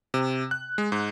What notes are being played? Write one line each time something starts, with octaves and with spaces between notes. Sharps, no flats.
C3
F#6
G#3
G#2